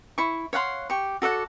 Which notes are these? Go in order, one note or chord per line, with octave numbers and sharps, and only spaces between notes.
E4 C#6
C#5 F5 F#5 C6
G4 C#6
F#4 A4 D5 F#5